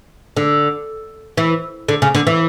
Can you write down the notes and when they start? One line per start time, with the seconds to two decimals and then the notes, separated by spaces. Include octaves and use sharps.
0.37 D3
1.37 E3
1.88 D3
2.02 C#3
2.15 D3
2.27 E3